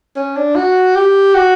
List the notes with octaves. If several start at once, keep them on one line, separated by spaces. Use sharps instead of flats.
C#4
D4
F#4
G4
F#4